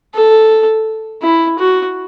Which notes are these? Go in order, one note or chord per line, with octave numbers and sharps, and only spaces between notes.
A4
E4
F#4